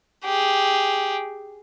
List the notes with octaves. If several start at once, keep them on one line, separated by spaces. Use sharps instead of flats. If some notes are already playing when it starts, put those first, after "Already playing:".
G4 G#4